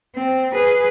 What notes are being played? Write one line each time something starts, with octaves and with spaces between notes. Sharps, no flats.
C4
G#4 B4